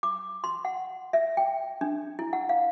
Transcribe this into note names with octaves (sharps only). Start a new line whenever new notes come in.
D6
C6
F#5
E5
G5
D4
E4
F#5
F5